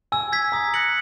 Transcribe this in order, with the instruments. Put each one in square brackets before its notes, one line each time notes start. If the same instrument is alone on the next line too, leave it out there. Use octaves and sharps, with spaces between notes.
[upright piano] G#5 [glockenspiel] E6
[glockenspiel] G#6 B6
[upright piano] A#5 [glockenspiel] D#6
[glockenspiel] F#6 A#6 C#7 F#7